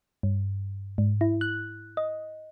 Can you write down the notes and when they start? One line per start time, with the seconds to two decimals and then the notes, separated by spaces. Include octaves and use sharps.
0.23 G2
0.98 G#2
1.21 E4
1.41 F#6
1.97 D#5